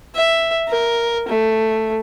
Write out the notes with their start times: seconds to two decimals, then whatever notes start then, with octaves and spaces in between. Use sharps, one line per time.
0.15 E5
0.68 A#4
1.29 A3